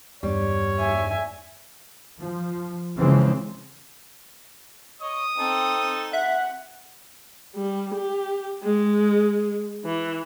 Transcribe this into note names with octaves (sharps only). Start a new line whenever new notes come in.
E2 G2 G3 C#5
E5 G#5
F3
C#3 E3 F3 G#3 C4
C#5 D#5 D#6
C4 D#4 A4
E5 F#5
G3
G4
G#3
E3